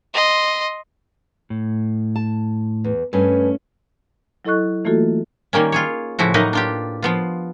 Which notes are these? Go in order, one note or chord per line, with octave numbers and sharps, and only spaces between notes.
D#5 C6
A2
A5
E2
G2 A3 C#4 G#5
F#3 E4 A4 D#5 C#6 F#6
E3 A3 A#3 F4 F#4 A4
D#3 G3 A#3 C#4
F4 G#4 C#5
A2 C#3 F3 E4 F#4
A2 F#3 A#3 D#4 B4 D#5
D4 F4 G4
F3 B3 F4